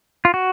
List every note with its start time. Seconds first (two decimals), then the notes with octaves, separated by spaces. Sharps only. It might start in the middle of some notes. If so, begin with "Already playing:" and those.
0.25 F4
0.34 F#4